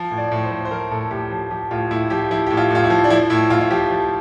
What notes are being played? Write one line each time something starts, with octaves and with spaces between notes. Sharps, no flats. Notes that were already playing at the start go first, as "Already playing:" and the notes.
Already playing: F3
A2
D5
A2
C5
F3
C5
F3 A#4
A2 A4
A2 G4
F3
F3 G4
A2 F4
A2 E4
F3 G4
F3 E4
A2 G4
F4
A2 F4
E4
F3
D4
F3 E4
A2 E4
A2 F4
F4
F3 G4
F3